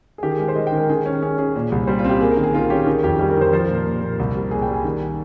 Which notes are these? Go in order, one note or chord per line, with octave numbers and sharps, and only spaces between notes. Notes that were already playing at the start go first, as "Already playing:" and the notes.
G#4
D#3 G4
G#4
G#3 A#4
C5
G#3 D#5
G5
D#3
A#4
D#3 G#4
C#4
C#4 G#4
C#4 G#4
A#2
C2
G3 C5
F4
C4
G4
A#3 G#4
A#4
D#3
G#4
D#3 F4
C#4 G4
D#3 G#4
F2 G4
G3 G4
A#4
D#3 C5
F3 C5
A#4
A#2
A#4
A#2
A#2
C2
G3
A#2 G#4
G5
G3
G#5
D#3